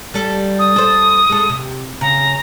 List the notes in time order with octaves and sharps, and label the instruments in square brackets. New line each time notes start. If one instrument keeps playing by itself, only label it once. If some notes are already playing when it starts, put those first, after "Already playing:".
[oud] G3 A4
[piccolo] D#6
[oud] A4 C5
G#3 A4
C3
[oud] C#3 [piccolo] A#5